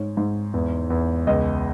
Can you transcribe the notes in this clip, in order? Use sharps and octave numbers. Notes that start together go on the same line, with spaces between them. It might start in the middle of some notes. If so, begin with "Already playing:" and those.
Already playing: G#2 C#5
G#2
E2
E2
C#2 D#5